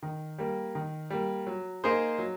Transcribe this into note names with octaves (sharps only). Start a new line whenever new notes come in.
D#3
G3 A#3
D#3
G3 A#3
F#3
A#3 D#4 G#4 C5
F#3